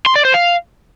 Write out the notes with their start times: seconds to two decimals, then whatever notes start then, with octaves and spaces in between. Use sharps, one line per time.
0.06 C6
0.16 D5
0.25 C5
0.34 F5